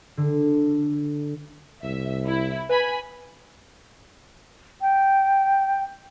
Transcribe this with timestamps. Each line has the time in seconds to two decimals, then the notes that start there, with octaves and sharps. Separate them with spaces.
0.17 D3
1.83 C2 E5
2.26 E4
2.69 B4 G#5 B5
4.82 G5